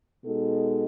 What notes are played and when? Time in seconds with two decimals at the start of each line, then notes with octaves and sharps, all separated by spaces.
0.25 B2 G#3 D#4 F#4 A4